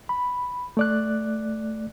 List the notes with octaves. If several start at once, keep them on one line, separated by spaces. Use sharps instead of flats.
B5
A3 D5 F#6